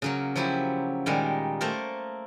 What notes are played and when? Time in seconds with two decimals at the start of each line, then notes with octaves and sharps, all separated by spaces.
0.02 C#3 F#3 A#3
0.36 F3 F#3 E4 G4
1.06 A#2 D#3 G3 G#3 A#4
1.61 A3 A#3 A4 A#4 C5